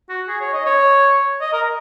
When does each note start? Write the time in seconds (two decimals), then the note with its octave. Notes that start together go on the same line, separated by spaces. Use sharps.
0.09 F#4
0.28 G#4
0.41 C#5
0.53 D#5
0.66 C#5
1.41 D#5
1.53 A#4